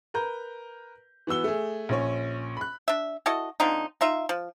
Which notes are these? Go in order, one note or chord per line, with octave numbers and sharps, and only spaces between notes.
A#4 B4 A#5 G6
E3 B3 F#4 E6 G7
A3 G#4
A#1 C#4 C#5
B5 F#6
D4 E5
E4 F#4 A4 D#5
D3 F3 C4 D#4
D#4 F4 E5
F3